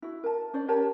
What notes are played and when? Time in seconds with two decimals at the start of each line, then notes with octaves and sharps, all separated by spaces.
0.02 E4 F#4
0.24 A#4 A5
0.54 C#4 C5 D5
0.68 G4 A#4 C#5 A5